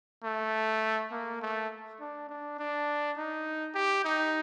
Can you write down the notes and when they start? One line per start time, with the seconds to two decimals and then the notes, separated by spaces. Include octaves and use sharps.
0.24 A3
1.12 A#3
1.42 A3
2.00 D4
2.29 D4
2.59 D4
3.17 D#4
3.75 G4
4.05 D#4